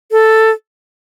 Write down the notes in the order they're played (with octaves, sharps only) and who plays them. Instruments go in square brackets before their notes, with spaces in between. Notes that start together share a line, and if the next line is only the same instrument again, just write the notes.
[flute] A4